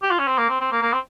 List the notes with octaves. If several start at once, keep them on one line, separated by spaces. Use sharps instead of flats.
G4
F4
C#4
C4
A#3
C4
C4
A#3
A#3
C4